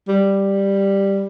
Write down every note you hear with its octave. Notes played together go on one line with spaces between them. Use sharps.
G3